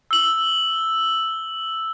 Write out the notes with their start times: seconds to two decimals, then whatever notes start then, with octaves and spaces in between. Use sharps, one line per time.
0.11 E6 F#7